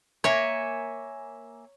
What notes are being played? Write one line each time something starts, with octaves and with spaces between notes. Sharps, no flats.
A#3 C#5 E5 G#5